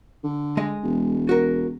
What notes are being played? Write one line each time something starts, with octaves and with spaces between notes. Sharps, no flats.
D3
G#3 D#5
E1
F#4 A#4